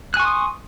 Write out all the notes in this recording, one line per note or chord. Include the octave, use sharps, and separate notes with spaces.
G#5 C6 C#6 D#6 F#6